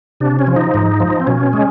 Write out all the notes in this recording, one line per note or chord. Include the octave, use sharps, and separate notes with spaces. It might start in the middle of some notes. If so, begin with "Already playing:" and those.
C3 D4
C#4
F3
D#4
G#2
F3
C4
B2 C#4
G#3